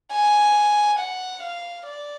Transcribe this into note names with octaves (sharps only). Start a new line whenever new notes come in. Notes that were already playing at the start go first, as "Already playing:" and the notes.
G#5
F#5
F5
D5